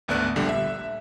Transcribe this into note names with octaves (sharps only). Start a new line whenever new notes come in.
G#1 D2 A3 B3 D5 F#6
A#1 D3 G3
E5